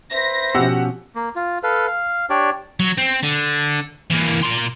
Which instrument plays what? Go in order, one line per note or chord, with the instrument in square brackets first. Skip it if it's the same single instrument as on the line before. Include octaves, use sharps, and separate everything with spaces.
[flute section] B4 C5 E5 [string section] A#6
[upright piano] B2 F3 C#4 [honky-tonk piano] G4 F#5 E6
[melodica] A#3
F4
A4 B4 F5
F5
D4 G4 C#5 D5
[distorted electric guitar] F#3
C4
D3
E3 A#3
A#2 C6